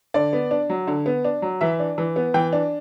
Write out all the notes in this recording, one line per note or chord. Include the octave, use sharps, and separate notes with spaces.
D3 D5
B3
D4
F#3
D3
B3
D4
F#3
E3 E5
D4
E3
B3
E3 G5
D4